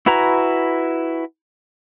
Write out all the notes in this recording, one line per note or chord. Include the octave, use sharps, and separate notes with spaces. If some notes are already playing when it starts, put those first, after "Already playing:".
E4 F#4 B4 G#5 A#5